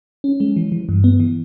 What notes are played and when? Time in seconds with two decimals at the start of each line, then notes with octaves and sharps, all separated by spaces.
0.24 C#4
0.40 G#3
0.56 E3
0.72 E3
0.89 G2
1.04 B3
1.20 E3